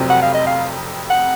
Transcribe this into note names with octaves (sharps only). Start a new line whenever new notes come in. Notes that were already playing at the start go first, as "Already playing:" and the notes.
Already playing: F1 F2 C3 F#3 C4
F#5
F5
D#5
F5
F#5